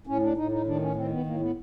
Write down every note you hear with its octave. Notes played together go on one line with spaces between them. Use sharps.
A2 C#4
D4
A2 D#4
D#4
D#3 D4
C#4
D#3 C4
B3
A2 A#3
B3